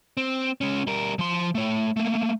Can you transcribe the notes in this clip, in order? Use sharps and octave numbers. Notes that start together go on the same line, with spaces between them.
C4
G#3 C#4
G3 A#4
F3 C6
A3 C#5
A3 A#3